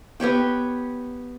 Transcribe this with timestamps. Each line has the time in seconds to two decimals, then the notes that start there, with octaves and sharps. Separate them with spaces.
0.20 B3 G4 C#5 G5